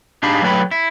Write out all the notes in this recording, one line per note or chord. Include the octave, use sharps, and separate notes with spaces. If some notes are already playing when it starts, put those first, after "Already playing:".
D4 D#4 G4 G#4 F5 B5
F#3 A3 B4 G5 B5
E4